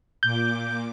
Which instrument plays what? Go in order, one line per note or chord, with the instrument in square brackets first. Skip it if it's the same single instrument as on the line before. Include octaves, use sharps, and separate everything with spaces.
[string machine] A#2 D6 [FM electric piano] G6